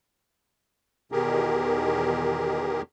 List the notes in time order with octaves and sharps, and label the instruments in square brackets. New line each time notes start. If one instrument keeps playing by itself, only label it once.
[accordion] E2 B2 D#3 G4 G#4 A#4